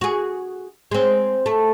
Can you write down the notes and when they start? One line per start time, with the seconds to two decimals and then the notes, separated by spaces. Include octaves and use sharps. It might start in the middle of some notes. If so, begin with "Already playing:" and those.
0.01 F#4 G#4
0.92 G#3 C4
1.46 A3